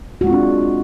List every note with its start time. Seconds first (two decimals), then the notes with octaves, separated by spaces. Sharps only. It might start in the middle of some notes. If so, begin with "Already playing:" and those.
0.21 F#4
0.24 G#3
0.27 F4
0.30 C4
0.33 D4